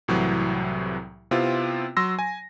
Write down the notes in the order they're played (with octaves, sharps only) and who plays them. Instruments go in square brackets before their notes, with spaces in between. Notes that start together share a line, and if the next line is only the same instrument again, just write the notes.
[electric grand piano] C2 A2 C3 E3 F#3
C3 B3 C4 E4 F4
F#3 C6 E6 A#6
G#5